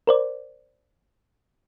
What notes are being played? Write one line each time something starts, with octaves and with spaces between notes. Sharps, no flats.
A#4 C5 D5